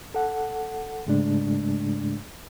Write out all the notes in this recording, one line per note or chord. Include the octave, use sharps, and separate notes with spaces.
A4 F#5
G#2 C#3 G#3 A3 D4